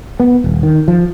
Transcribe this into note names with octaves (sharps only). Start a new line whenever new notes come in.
B3
D#1
D#3
F3